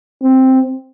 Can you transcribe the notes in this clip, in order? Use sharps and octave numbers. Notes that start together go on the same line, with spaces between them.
C4